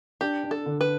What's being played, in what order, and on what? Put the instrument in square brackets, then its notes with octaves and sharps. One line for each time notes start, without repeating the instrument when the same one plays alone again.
[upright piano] D4 [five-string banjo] G4
[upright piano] D4
[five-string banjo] A4
[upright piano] D3
[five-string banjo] B4